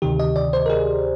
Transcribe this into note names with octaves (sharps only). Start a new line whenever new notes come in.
D2 C3 D#3 G4
D#5
D5
C5
A#4
G#4